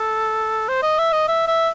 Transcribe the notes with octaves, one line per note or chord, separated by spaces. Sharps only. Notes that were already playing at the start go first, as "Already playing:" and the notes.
Already playing: A4
C5
D#5
E5
D#5
E5
E5